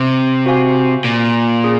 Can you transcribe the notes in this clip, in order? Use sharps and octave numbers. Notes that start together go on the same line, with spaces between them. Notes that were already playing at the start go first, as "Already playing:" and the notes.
Already playing: C3
F#4 C5 F5 G#5
A#2
C#4 G#4